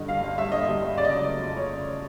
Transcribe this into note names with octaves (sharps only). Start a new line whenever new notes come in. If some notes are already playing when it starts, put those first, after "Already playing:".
Already playing: G2 D3 D#5
G3 F5
G1
G2 E5
D3 D#5
G3 E5
G1
C#3 D5
D#5
F#3 D5
A3
F2
C#3 C#5